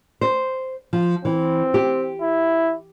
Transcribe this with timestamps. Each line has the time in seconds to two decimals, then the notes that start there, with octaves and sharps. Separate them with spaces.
0.21 C5
0.93 F3
1.25 E3 C4
1.74 G4
2.21 E4